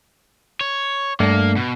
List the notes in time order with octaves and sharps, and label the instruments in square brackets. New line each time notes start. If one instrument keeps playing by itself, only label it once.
[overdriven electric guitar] C#5
[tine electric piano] G2 A3 D4 [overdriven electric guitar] A#3
[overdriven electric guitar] B2